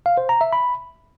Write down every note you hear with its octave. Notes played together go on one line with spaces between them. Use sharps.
F5
C5
A#5
E5
B5